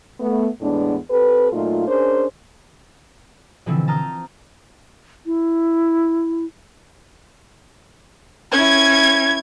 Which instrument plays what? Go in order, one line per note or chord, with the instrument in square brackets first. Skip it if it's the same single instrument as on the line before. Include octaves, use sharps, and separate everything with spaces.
[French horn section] A3 B3
E2 A2 G#3 B3 D4
C4 G4 A4 B4
A#2 F#3 A3 D#4 F4
C#4 D4 G#4 A#4 C5
[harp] B2 D3 E3 F3 C4 E4
A5 A#5 D#6 F6 G6
[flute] E4
[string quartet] C#4 E4 [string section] G#6